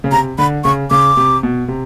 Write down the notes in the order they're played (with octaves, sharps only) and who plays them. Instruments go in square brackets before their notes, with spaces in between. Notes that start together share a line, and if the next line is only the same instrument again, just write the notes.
[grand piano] C#3
[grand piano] C3 [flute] A#5
[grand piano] D3 [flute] B5
[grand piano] C#3 [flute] C#6
[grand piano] C#3 [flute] D6
[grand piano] C3
B2
C3